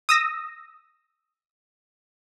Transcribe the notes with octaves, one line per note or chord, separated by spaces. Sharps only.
D#6 E6 A#6